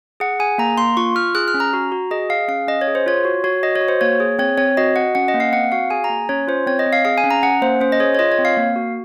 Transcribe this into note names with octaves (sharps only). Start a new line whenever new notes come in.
G#4 F#5
G#4 G#5
A#3 A#5
A#3 C6
F4 C#6
F4 F6
G#4 F#6
F6
C#4
A#5
F#4
F#4
G#4 D#5
G#4 F5
C#4 F5
C#4 D#5
C#5
G#4
C5
F4 C#5
F#4
F#4 C#5
F#4 D#5
C#5
F#4
C5
A#3 C#5
G#4
C4 C#5
C4 C#5
F#4 D#5
F#4 F#5
C#4 F#5
D#5
A#3
F5
C4 F#5
F#4 F5
G#4 G#5
A#5
A#3
C#4 C#5
F4 C5
C4 C#5
D#5
C4
F5
G#4 F5
G#5
C#4
A#5
C#4 F#5
A#3 C5
C#4 C5
D#5
G#4 C#5
C#5
F4 D#5
C#5
C4
F5
A#3
F#4